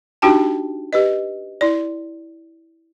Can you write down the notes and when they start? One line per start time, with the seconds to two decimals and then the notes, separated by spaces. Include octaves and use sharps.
0.22 D4 D#4 F#4 G4 G5 A5
0.93 G4 B4 D#5
1.61 E4 D5